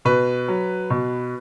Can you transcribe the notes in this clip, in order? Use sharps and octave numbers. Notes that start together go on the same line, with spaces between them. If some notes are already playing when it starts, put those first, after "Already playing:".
B2 B4
F#3
B2